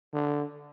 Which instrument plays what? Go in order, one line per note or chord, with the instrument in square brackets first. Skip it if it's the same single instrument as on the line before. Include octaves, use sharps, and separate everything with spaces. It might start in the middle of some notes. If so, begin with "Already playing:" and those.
[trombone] D3